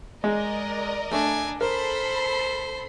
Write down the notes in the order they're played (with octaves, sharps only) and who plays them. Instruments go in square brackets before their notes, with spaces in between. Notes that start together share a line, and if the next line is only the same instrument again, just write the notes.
[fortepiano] G#3 [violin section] A#4 D5 D#5
[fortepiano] A3 [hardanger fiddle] D4 G#5
[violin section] A4 B5 C7 [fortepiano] A#4 [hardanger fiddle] C5